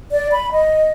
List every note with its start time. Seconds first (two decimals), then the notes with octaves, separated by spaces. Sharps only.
0.11 D5
0.32 B5
0.52 D#5